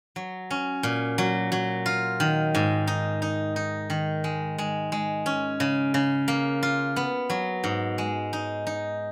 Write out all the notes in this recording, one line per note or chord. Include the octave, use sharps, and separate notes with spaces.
F#3
C#4
A#2
F#3
F#3
F4
D#3
G#2
D#4
D#4
D#4
D#3
G#3
G#3
G#3
C#4
C#3
C#3
A#3
F4
B3
F#3
G#2
G#3
D#4
D#4